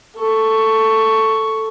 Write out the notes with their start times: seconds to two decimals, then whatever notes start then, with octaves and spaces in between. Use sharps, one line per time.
0.16 A4 C#6